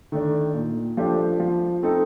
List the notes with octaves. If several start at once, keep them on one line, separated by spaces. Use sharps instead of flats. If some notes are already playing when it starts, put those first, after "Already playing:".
D#3 A3 D4
A#2
F3 A3 D4 G4
F3
A3 C4 D#4 A4